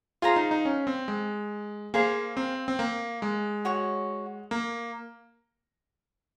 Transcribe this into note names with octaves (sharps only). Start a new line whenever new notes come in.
F4 G#4 C5 F5 A#5
D#4
D#4
C#4
C4
G#3
A#3 G#4 C5 F5
C4
C4
A#3
G#3
F#4 C#5 F#5
A#3